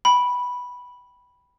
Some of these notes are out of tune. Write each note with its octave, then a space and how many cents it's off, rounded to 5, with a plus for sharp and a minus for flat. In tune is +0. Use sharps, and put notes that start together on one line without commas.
G5 +0 B5 -5